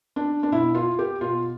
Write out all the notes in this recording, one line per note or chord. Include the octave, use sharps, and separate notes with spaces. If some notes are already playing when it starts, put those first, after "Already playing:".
D4
D4
B2 E4
F4
G4
B2 F4